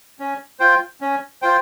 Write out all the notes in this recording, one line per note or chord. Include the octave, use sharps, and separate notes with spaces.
C#4
F4 C5 G5
C#4
F4 C5 G5